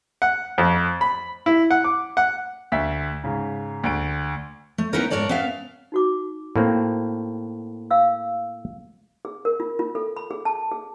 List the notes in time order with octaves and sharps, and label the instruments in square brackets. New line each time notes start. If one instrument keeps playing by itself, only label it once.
[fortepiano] F#5
F2
B5
E4
F#5
D6
F#5
[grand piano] D2 E5 B6
G#2 C#3
D2 D7
[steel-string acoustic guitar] A3
B3 C#4 D#4 E4 A#4
G#2 D#3 A#4 C#5 D5 A5
B3 C#4 E5 F5
[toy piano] D#4 F#4 D6
[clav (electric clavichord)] A2 A#3 C4
[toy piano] F5 E6
G#4
A#4
F4
F4
A4
B5
G#4
A5
G#4